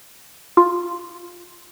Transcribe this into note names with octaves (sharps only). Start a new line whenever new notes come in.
F4